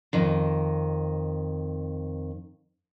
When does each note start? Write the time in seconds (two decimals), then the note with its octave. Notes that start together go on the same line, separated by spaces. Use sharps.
0.13 F2 D#3